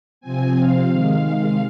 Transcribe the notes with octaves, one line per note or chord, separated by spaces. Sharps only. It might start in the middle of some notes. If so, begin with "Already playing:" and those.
C3 F3 C4 G#5
F5
C3 D#3 G#3